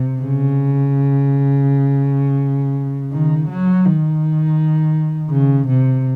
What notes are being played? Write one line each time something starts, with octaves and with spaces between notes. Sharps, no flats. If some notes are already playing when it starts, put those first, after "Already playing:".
Already playing: C3
C#3
D#3
F#3
D#3
C#3
C3